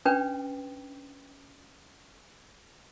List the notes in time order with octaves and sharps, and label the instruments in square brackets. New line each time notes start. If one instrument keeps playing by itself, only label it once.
[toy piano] C#4 D4 B4 G5